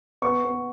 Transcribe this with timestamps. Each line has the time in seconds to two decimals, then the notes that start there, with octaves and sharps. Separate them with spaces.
0.22 B3 C#6
0.44 B3